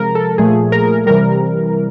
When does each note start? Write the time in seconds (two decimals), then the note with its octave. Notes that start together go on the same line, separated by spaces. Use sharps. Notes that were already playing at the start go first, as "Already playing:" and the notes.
Already playing: C3 F3 G#3 A#4
0.15 A4
0.38 A#2 F3 A3 G#4
0.72 A#4
1.06 C3 E3 G3 A#4